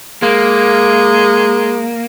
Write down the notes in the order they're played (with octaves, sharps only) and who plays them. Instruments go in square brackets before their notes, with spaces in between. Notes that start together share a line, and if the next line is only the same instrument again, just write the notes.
[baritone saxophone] G#3 [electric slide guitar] A#3